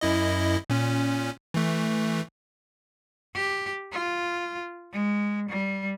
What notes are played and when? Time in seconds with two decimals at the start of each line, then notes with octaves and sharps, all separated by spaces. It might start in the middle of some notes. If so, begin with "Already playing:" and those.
0.01 F#2 E4 D#5
0.70 A#2 C#4
1.54 E3 A3
3.35 G4
3.92 F4
4.93 G#3
5.49 G3